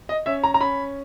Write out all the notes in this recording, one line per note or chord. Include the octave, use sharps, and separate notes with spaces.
D#5
C#4 E5
A#5
A#5
C#4 B5